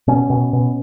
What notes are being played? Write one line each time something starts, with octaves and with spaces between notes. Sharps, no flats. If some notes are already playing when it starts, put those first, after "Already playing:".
B2 C#4
B2
B2